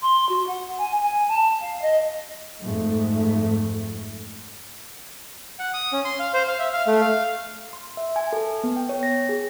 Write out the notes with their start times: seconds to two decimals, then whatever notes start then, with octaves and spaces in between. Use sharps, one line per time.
0.01 C6
0.29 F#4
0.47 F#5
0.77 G#5
1.00 G#5
1.28 A5
1.60 F5
1.81 D#5
2.61 F2 G#2 A3
5.59 F#5
5.74 D#6
5.92 C#4
6.05 C6
6.20 F5
6.34 C5
6.48 F5
6.59 E5
6.73 F5
6.87 A3
7.01 F5
7.73 C6
7.97 E5
8.16 G#5
8.33 A4
8.64 B3
8.76 G5
8.89 C#5
9.03 A#6
9.29 G#4